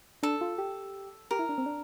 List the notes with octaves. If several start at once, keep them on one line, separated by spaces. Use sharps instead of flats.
D4 A4
F4
G4
G4 A#4
E4
D4
C4
D4